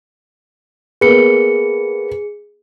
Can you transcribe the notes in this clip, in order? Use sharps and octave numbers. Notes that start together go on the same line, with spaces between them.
A#3 B3 G#4 C#7